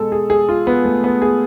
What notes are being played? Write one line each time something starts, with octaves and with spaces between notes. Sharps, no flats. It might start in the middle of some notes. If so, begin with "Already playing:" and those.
Already playing: B2 G#3 A4
G#4
G#4
F4
B3
A3
B3
G#4